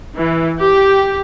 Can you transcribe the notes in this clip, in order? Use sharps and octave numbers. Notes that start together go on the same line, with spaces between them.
E3
G4